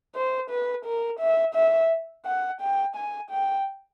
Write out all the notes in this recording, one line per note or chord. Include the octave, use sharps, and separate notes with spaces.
C5
B4
A#4
E5
E5
F#5
G5
G#5
G5